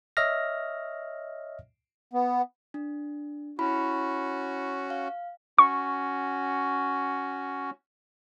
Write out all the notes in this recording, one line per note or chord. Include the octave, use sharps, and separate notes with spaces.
C#5 D#5 E5 F6 A#6
B3
D4
C#4 E4 F#4 B5
F5
C#4 F#4 C#6